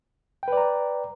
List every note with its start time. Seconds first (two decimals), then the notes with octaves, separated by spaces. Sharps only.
0.43 G5
0.48 B4
0.53 D5
0.57 A#5